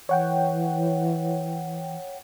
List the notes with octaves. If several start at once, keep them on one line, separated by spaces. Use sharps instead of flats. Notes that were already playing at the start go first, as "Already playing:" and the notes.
E3 C#5 F#5 G5